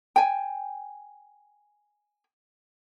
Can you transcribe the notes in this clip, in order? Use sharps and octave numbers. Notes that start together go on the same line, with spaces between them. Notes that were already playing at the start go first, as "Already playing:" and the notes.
G5 G#5